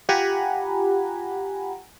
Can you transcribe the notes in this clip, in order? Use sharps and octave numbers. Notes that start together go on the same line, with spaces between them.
F4 G4 F#5 G#5 A#5 B5